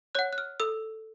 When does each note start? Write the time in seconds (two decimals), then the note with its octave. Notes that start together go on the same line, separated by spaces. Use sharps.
0.15 C#5 F#5 F#6
0.33 F#6
0.38 F6
0.60 A4 E6